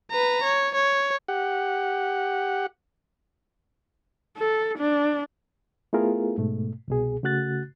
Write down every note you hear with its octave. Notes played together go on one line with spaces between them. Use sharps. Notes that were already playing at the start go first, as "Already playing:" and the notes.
B4 A#5
C#5
C#5
G4 F#5
A4
D4
A3 B3 E4 F4 G#4 A#4
G#2 B2 A3
C2 B2 G#4
C#3 A3 F#4 F#6 A6